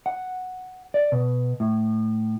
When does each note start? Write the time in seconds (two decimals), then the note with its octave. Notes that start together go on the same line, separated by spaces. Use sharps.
0.06 F#5
0.94 D5
1.12 B2
1.60 A2